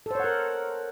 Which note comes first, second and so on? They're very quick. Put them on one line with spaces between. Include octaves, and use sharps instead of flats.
A4 C5 C#5 F#5 A#4